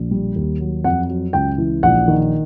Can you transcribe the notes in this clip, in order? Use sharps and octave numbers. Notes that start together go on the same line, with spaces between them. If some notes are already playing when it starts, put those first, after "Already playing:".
Already playing: A#1
G3
D#2
F#3
F2 F#5
F#3
C#2 G5
E3
A#1 F#5
D#3